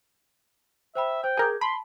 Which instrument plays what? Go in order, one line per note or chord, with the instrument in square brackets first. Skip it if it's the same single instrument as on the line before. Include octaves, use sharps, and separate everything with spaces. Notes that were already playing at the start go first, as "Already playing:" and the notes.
[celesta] C5 G5 B5 [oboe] E5
[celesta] C5 [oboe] G5
[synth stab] G#4 A#4 [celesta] D6 G6 G#6
[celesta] A5 [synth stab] B5 [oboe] C6